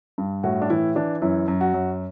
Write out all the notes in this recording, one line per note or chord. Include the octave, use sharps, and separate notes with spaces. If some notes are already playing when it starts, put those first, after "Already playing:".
G2
A2 F#4
D4
E3 E4
E3 D4
F#2 E4
F#2
F#4
F#2